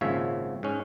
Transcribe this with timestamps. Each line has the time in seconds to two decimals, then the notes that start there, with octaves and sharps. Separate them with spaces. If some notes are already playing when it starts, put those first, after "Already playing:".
0.01 G#1 A#2 C#3 F3 C#5 E5
0.63 G#2 C#4